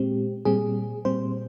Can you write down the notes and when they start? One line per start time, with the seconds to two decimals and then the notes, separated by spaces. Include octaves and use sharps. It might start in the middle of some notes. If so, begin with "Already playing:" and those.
Already playing: A#2 G#3 C4 G4
0.45 A#2 G3 C4 G#4
1.05 A#2 G3 C4 C5